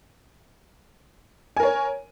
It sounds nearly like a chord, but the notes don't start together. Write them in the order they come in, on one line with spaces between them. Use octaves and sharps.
G#5 A#4 C#5